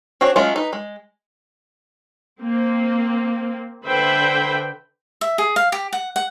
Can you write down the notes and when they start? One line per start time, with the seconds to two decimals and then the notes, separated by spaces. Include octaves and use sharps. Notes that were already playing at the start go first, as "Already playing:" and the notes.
0.21 C4 D4 F#4 G#4 C#5
0.36 F#3 G#3 A3 C#4 F4
0.56 D#4 B4
0.73 G#3
2.42 A#3 C4
3.84 D3 B4 C5 E5 G5 B5
5.21 E5
5.38 G#4
5.56 F5
5.72 G4
5.93 F#5
6.16 F#5